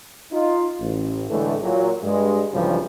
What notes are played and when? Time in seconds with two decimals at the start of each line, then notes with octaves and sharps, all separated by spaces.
0.32 D#4 F4
0.80 A1
1.29 A2 D3 E3 G#3 A3
1.63 A#2 F#3
2.03 G2 G#3
2.53 B1 G2 C#3 E3 F3 G3